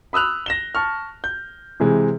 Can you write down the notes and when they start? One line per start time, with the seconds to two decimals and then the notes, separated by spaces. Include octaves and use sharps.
0.13 B5 D#6 E6 F#6 F7
0.46 A#6 E7 G7
0.75 A5 C#6 F6
1.24 G6
1.80 C3 E3 G#3